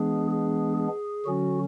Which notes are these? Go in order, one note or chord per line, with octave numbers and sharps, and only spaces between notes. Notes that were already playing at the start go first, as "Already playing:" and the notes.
Already playing: E3 G#3 B3 D4 G#4
G#4
G#4
D3 F#3 C#4 F#4